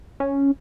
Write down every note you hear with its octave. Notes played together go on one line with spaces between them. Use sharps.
C#4